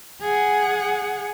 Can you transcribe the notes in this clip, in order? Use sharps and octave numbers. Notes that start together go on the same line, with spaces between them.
G#4 F#5